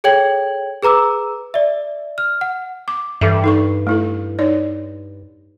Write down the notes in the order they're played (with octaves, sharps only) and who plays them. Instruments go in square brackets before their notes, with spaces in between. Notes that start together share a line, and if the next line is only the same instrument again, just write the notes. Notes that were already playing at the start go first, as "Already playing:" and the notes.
[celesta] G#4 A4 C#5 G5 G#6 F#7
G#4 B4 A#5 D6 E6
D5 E5
F6
F#5
[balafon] D6
[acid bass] G2 [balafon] E3 A4 E5
[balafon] D#4 A4 C#6
A3 E4 A4
D#4 C#5 D5